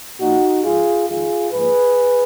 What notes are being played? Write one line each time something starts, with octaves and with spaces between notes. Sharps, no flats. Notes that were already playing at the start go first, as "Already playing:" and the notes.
A#2 F3 A#3 D#4 F#4
G#2 F3 G#3 F4 G#4
F2 D#3 G#3 F4 G#4
G#2 F3 A#3 G#4 B4